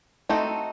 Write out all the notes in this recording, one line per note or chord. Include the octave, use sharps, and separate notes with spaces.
A3 C4 D#4 F#4 A4